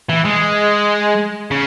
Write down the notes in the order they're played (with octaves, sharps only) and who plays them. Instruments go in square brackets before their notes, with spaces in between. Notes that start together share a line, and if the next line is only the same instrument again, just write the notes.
[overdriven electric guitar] E3
G#3
C#3